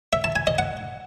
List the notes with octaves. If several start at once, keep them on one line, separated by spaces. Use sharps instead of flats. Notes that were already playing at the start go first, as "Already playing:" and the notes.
E5
A5
G#5
D#5
F#5